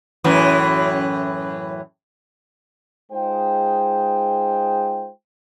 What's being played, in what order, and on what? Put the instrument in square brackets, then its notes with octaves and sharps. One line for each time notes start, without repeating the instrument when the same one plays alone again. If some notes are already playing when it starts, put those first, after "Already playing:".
[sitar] F#2 A2 E3
[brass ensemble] G#3 D#4 F4 G#4 C5 G5